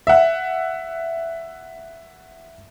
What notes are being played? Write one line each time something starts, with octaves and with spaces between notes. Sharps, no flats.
E5 F#5